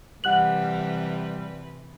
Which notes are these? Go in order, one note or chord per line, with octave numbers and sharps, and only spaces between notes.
C3 E3 G3 B4 F#5 F#6 F#7